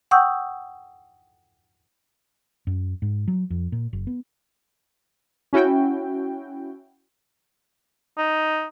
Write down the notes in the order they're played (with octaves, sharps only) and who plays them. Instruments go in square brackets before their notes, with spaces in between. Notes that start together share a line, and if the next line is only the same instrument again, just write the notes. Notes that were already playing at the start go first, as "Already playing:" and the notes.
[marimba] F#5 G5 C#6 D#6 E6 G6
[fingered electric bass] F#2
G#2
F#3
F2
A#2
F#1
B3
[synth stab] C#4 E4 F#4 G5
[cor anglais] D#4